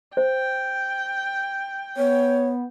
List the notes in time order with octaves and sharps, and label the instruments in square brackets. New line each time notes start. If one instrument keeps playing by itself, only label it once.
[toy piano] C5 [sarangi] G5
[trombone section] B3 [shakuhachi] C#5